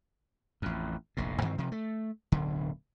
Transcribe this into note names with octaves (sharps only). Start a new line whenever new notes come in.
A1 F2
F1 A#1 A2
G2 D#3 E3 C4
C3 F3
A3
D1 B1 D3